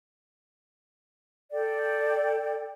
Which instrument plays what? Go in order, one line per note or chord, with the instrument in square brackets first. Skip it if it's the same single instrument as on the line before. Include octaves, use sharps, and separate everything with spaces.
[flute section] A4 D5 G5